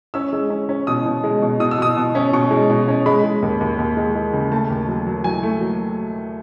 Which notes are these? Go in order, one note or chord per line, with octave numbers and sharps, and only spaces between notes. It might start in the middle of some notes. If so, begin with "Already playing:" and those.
C#4 E6
G#3
C#4
C#4
B2 D#6
B2
G#3
B2
B2 D#6
E6
B2 D#6
B2
C#4
B2 C#6
G#3
B2
C#4
G#3 B5
G#3
D#2
D#2
D#2
G#3
G#3
C#3
A3 A5
D#2
F#3
F#3
F#3 G#5
A3
F#3